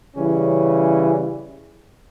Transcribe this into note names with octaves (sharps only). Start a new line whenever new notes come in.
C#3 E3 G3 C#4